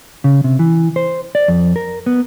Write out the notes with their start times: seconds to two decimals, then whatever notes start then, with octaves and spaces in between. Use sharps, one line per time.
0.24 C#3
0.44 C3
0.59 E3
0.96 C5
1.35 D5
1.48 F2
1.76 A#4
2.06 B3